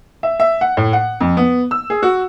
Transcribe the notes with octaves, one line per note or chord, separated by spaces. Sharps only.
E5
E5
F#5
A2
F#5
F2
B3
E6
G#4
F#4